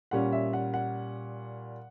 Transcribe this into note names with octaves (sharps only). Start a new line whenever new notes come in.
A#2 G3 C#4 F#5
E5
F#5
F#5